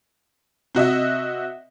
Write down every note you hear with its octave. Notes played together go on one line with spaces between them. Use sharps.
C3 F#4 D#5 E5